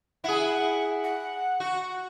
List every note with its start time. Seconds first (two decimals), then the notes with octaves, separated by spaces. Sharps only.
0.24 E4 G#4 F#5
1.04 F#5
1.60 F#4